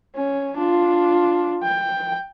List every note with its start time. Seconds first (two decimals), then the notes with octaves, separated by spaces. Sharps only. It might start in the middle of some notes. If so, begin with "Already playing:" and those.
0.16 C#4
0.58 D4 F4
1.63 G5